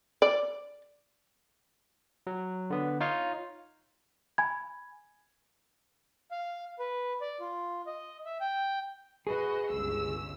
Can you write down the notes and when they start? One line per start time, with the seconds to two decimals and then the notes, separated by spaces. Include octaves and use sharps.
0.22 D5
2.27 F#3
2.70 D3 B3
3.00 D#4 F4 C#5 F5
4.38 G#5 B5 G#6
6.31 F5
6.79 B4
7.21 D5
7.40 F4
7.86 D#5
8.25 E5
8.40 G5
9.27 F#4 G#4 B4 D#5
9.71 G1 C#2 E6